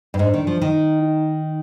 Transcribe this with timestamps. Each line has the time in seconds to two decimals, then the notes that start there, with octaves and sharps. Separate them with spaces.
0.14 G2
0.19 G#2 D4
0.34 D#3
0.47 F3
0.61 D#3 D#4
1.02 D#4